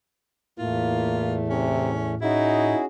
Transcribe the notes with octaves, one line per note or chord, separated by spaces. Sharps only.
E2 A2 A3 A#3 F4
C3 C#4
C#4 D#4 E4 F#4 G#4